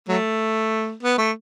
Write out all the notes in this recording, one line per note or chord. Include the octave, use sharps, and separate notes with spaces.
F#3 A3
B3
A3